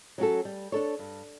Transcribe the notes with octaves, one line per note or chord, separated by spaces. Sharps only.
F#3 C#4 F#4 A4
G3
D4 A4 C#5
G2